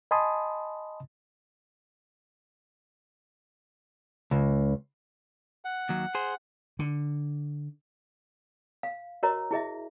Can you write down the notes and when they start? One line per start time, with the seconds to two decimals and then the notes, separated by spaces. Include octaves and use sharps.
0.11 D#5 G#5 A5 B5 C6 D#6
4.31 C#2
5.65 F#5
5.89 D#2 F#3
6.15 G#4 C5
6.79 D3
8.83 F5
9.23 F#4 A#4 C#5 D#5 A#5
9.51 E4 G#4 D#5 E5